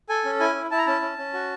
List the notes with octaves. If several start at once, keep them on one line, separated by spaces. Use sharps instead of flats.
A4 G#5
C#4
E4 G#5
E4
E4 A5
A#5
C#4 A5
C#4
C#4
F#4